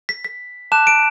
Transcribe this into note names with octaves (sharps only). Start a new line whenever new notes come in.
B6
B6
A5 D6 F#6 E7
D7